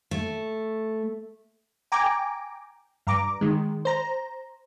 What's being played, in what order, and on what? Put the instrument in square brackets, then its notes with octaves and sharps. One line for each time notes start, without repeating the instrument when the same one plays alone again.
[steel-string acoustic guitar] A3
[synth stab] G5 G#5 A#5 D6
G2 A#5 D6
D#3 G#3
C5 A#5